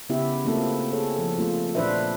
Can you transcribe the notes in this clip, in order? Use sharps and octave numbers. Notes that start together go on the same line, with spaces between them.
C#3 B3 E4 G4 E5
A3 A#3 C4 E4 F4 A4
G#4 A4 C#5
F3 A4
A3 A#3 C4 F4
A#2 E3 D4 B4 C5 E5